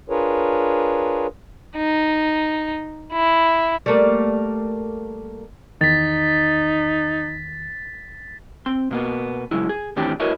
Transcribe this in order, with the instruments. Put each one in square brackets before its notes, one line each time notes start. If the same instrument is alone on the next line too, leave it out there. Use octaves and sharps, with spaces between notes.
[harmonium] D4 F4 G#4 A#4 B4 C#5
[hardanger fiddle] D#4
E4
[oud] G3 A3 A#3
[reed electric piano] E2 D#3 [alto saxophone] D#4 [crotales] A6 B6
[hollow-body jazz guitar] C4 C6
B2 A#3 B3
C#3 F#3 G#3 E4
G#4
A2 D#3 E3 C4 D4 G4
E4 F#4 A#4 B4 C#5 D#5